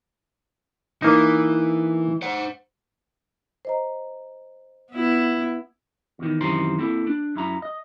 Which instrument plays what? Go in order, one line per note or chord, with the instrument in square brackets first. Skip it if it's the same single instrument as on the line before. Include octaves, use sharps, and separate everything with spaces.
[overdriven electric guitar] E3 [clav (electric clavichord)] A#3 D#4
[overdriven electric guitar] C5 F#5
[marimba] C5 D#5 A#5
[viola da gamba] B3 E4
[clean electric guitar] E2 D#3
F#2 C3 D#3 E3 C5 A#5
A#3 C4 E4 A4
D4
F#2 E4 A#5
D#5